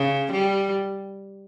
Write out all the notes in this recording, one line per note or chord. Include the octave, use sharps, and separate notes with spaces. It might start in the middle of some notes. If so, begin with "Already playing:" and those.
Already playing: C#3
G3